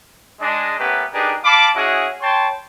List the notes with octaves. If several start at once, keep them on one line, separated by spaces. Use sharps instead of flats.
G#3 D4 D#5
A3 B3 C#4 G4 A#4 B4
D4 D#4 G4 G#4 A#4 B4
F5 A5 B5 D6
C#4 E4 F#4 G#4 D#5 F#5
C#5 G5 A5 B5 C6